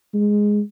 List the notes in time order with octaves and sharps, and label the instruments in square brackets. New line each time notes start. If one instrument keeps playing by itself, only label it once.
[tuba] G#3